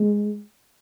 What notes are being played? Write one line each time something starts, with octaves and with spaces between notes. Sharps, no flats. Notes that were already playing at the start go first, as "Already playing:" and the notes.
Already playing: G#3